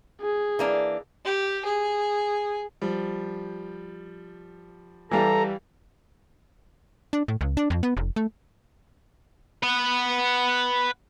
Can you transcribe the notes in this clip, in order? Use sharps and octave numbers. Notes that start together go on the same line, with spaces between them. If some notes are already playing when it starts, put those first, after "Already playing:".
G#4
E3 A#3 D4
G4
G#4
F3 G3
E3 G3 G4 A4 F5 A#5
D4
A2
C#2
D4
F2
B3
F1
A3
B4 F#5